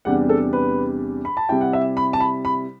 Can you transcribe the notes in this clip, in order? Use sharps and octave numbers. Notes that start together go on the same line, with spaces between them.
E2 C3 G3 D4 F#5
A4
B4
B5
A5
C3 G3 C4 E4 G5
F#5
E5
B5
A5
B5
B5